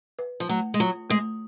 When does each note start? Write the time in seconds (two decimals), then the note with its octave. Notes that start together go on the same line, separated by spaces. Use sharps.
0.19 B4
0.40 F3
0.49 F#3 A3
0.74 G#3
0.80 F#3 F4
1.10 G#3 A3